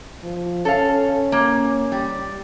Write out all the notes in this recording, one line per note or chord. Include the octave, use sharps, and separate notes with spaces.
F3
C#4 A4 F5
A#3
G3